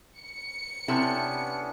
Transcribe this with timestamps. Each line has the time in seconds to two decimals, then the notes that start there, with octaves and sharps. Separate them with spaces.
0.18 C#7
0.88 C3 B3 C#4 D4 E4 A4